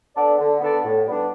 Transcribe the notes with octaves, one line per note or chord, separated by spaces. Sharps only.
B3 D4 A4 D5
D3
B3 D4 A4 D5
A2
G3 B3 D4